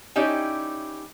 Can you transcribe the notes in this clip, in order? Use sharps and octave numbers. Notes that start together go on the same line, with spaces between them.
C#4 D#4 E4 G4 D5